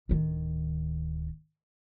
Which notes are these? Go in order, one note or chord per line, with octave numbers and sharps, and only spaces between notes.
D1 D#3